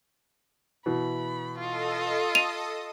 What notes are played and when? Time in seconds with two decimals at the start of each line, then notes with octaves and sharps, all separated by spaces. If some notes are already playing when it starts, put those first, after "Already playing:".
0.86 B2 E3 B5
1.59 F4 A4 D#5 D#6
2.35 D#7 F7